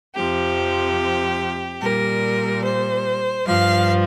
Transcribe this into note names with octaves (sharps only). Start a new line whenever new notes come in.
F2 C3 F3 G4
A#2 G3 A#4
C5
G2 F3 F5